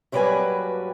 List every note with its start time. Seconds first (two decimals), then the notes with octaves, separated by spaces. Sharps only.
0.12 G2 F#3 G3 A#3 B4 G#5